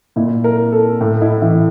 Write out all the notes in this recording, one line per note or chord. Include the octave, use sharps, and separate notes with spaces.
A#2 E4
A#4
A4
A2
E4
E3 E4